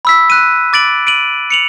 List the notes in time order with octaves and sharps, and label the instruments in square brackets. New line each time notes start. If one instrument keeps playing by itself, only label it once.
[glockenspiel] B5 E6 B6
F#6 D#7
D6 A6 D7 F#7
D7 D#7 F#7
C#7 F7 F#7